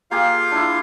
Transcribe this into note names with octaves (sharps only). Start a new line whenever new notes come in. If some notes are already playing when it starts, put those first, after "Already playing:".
A#3 F4 G4 G#4 F5
D4 E4